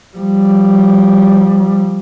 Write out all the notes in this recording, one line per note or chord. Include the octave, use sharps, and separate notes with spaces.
F3 G3